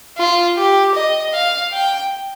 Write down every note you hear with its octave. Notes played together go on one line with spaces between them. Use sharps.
F4
G4
D#5
F5
G5